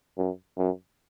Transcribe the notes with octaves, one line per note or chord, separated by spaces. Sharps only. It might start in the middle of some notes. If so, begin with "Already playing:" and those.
F#2
F#2